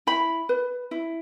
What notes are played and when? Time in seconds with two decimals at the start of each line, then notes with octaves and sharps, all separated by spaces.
0.07 E4 B5
0.49 B4
0.91 E4